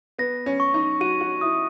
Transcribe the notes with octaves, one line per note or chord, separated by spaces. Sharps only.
B3 A#6
C#4
C#6
D#4
F#4 D#7
F#4
E4 D#6